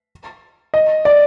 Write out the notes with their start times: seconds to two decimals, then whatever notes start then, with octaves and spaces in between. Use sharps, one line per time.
0.74 D#5
1.05 D5